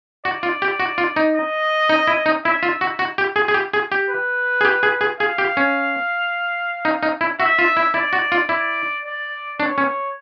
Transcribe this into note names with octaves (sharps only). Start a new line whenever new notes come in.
F#4 D5
F4
G4
F#4
F4
D#4
D#5
D#4
E4
D#4
E4 E5
F4
F#4
F#4
G4
G#4
G#4
G4
G#4
G4
B4
G#4
G4
G#4
G#4
G#4 F5
G4
C#4
D#4
D#4
E4
F#4 E5
F4
E4
E4 D5
F#4
F4
E4 D5
D5
D4 C#5
C#4